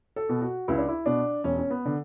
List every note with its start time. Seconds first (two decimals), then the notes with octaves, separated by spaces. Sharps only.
0.16 A4
0.29 B2
0.42 F#4
0.68 C#2 E4
0.78 D4
0.88 E4
1.06 B2 D4
1.44 E1 C#4
1.59 C#4
1.70 B3
1.86 D3